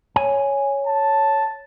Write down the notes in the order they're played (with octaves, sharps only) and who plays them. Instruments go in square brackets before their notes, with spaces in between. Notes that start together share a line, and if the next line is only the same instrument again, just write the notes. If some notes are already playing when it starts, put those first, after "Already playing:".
[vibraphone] C#5 [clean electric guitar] G#5
[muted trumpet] A5